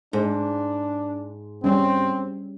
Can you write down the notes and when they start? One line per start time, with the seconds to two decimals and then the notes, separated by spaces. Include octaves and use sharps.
0.13 G#2 D4
1.64 G3 C4 C#4